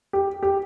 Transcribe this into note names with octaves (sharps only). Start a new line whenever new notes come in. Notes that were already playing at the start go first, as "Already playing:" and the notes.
G4
G4